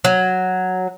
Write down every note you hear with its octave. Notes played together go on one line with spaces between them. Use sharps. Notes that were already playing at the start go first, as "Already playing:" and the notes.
F#3